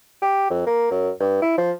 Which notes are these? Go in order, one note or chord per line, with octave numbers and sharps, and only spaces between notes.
G4
F2
A#3
F#2
G2
E4
F3